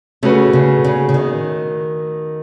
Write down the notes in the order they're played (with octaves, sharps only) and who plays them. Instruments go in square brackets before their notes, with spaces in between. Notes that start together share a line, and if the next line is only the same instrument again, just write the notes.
[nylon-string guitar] C#3 [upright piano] A3 C#4 F#4 B4
[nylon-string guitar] C#3
C#3
C#3
D#3